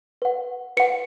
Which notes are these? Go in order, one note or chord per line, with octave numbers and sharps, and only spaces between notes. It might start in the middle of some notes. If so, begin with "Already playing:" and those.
B4 F#5
B4 F#5 C#7